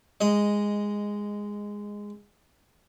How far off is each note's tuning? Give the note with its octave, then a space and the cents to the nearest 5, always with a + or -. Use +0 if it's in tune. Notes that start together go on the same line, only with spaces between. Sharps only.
G#3 -10 D#5 +0